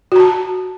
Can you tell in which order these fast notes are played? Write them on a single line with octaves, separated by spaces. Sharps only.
F#4 A#5 A5